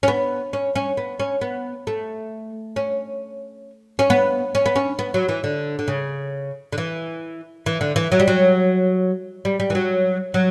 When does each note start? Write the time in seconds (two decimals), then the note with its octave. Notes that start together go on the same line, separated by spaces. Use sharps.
0.03 C#4
0.08 B3
0.53 C#4
0.75 C#4
0.97 B3
1.20 C#4
1.41 B3
1.87 A3
2.76 C#4
3.99 C#4
4.10 B3
4.55 C#4
4.66 B3
4.76 C#4
4.99 B3
5.14 F#3
5.29 E3
5.44 D3
5.79 D3
5.88 C#3
6.72 D3
6.78 E3
7.66 E3
7.81 D3
7.96 E3
8.12 F#3
8.20 G3
8.28 F#3
9.45 G3
9.60 G3
9.70 E3
9.75 F#3
10.34 F#3